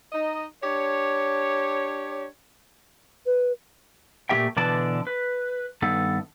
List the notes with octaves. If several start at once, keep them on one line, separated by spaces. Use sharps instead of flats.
D#4 D#5
D4 G4 C#5
B4
A#2 A3 A#3 G4 E5 G5
B2 D3 E3 D4 D5 A5
B4
G2 D#3 B3 A4